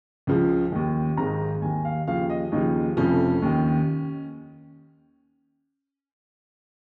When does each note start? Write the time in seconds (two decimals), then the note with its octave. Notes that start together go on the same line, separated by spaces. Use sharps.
0.27 C#2 C#3 F3
0.72 D#2 D#3
1.17 G#1 G#2 D#3 A#5
1.62 D#2 D#3 G#5
1.85 F5
2.07 D#2 C#3 F3 F5
2.30 D#5
2.52 D#2 C#3 F3 D#4
2.97 F1 F2 F3 C#4
3.42 D#2 D#3